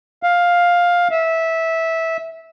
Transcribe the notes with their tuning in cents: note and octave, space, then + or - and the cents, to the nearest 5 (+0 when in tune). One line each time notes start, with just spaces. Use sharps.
F5 +10
E5 -15